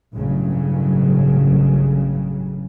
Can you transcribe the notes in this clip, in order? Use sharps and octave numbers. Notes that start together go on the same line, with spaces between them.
A1 G2 C#3 F#3